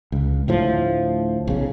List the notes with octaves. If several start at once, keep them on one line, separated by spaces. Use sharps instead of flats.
C#2
D2 A2 F3
B1 C#3